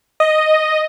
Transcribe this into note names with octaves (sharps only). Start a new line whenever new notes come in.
D#5